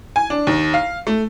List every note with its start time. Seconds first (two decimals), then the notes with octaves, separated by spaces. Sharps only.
0.16 G#5
0.30 D4
0.47 D#2
0.74 F5
1.07 A3